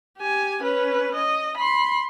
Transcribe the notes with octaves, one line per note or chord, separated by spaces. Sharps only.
G4 G#5
C#4 B4
D#5
B5 C6